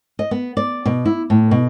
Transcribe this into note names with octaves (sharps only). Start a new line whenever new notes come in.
D#5
B3
D5
B2
E4
A2
B2